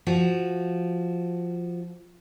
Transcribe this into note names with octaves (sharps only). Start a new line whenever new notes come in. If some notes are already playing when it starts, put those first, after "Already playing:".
F3 F#4